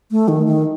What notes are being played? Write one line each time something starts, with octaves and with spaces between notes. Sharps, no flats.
A3
D#3
D#3